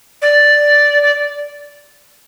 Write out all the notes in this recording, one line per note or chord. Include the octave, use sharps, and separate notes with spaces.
D5
D5